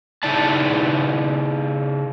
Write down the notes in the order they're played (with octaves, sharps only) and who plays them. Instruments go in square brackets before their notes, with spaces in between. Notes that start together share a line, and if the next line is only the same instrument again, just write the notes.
[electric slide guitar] C#3 D#4 E4 D5 A5